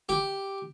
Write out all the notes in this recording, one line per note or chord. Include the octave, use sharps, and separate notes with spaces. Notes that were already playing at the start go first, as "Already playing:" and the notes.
G4